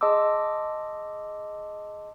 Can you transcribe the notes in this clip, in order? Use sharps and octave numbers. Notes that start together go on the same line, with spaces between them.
G#4 D#5 A5 C6 D6 E6